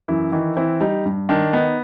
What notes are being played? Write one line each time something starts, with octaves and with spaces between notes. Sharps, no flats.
F#2 E3 E4
D#3 E3 E4
E3 C4 E4
G3 D#4
G2
D#3 D4
B3 D#4